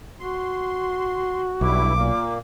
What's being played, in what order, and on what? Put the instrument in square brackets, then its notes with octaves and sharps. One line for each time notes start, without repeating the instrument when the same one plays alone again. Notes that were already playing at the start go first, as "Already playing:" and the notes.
[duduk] F#4 [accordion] C6
[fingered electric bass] B1 [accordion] G2 E4 [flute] D6
[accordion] A#2 A#3